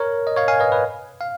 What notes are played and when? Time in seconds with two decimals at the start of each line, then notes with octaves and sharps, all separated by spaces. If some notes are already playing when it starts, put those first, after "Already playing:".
Already playing: A#4 C#5
0.27 D#5
0.36 C#5 F5
0.48 F5 G#5
0.60 B4 D#5
0.72 B4
1.21 F5